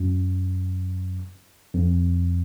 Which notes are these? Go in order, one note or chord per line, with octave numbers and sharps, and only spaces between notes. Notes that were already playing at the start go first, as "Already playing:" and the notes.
Already playing: F#2
F2